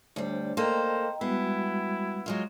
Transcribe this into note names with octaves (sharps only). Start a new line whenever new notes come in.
D2 G3 D4 C5 C#5
A#3 A4 C5 D#5 G5 A#5
G3 G#3 B3 E4 F#4
F#3 G#3 F4